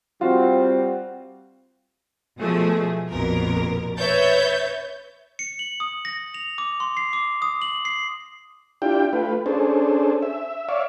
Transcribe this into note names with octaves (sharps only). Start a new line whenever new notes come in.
G3 C4 F4 F#4
B2 F3 A3 G#4
A#1 F2 B2 A#4
B4 C#5 E5 G6 A6
C#7
F#7
D#6
A#6
F7
D6
C6
C7
D6
D#6
F#7
C7
D4 E4 F4 G4 G5
A3 F4 B4
C#4 D4 G#4 A4 C5
E5
C#5 D5 E5 F5